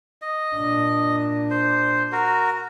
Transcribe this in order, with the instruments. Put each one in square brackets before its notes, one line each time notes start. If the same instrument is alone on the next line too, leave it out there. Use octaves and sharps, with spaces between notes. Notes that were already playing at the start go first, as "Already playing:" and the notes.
[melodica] D#5
[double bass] A#2 D4
[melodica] C5
F#4 A#4